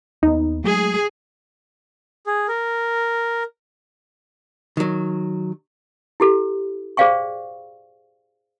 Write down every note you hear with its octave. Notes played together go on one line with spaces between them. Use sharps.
D#2 B3 D#4
F#3 G#3 A3 G#4
G#4
A#4
D#3 F#3
E4 G4 A4
G#4 C5 D5 F5 G5 C#6